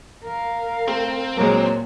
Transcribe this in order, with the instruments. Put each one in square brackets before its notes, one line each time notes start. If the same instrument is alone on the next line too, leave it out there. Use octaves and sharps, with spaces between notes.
[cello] A#4 F5
[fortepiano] A3 [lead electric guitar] C4
[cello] A#2 [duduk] F#3 [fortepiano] G#3 A#3